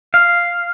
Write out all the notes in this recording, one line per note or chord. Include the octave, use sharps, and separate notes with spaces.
F5